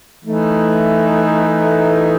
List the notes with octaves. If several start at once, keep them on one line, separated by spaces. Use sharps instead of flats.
E3 A3 D#4